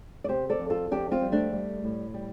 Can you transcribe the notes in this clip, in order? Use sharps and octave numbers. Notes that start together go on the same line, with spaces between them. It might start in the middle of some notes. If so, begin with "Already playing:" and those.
D5
C3 G4 C5
A4 D5
F2
F4 A4
F2 D4 G4
C4 F4
G3
A3 D4
G3
A2
G3